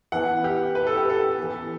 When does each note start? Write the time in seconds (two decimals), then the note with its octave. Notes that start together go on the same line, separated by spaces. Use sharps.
0.12 E3 B3 F#5
0.44 G4
0.75 B4
0.87 A4
0.97 G4
1.10 A4
1.38 E3 B3